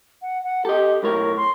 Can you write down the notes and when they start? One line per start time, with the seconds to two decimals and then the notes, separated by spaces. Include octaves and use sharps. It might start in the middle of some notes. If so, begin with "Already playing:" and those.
0.22 F#5
0.44 F#5
0.65 G4 A4 D#5
1.03 B1 A2 A#4 C#5
1.37 C6